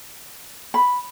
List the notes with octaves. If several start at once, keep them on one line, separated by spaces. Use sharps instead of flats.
B5